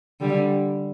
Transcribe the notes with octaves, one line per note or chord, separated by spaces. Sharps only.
D3 G3